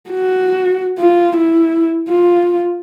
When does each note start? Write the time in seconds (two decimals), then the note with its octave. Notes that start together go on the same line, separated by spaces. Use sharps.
0.10 F#4
0.99 F4
1.37 E4
2.10 F4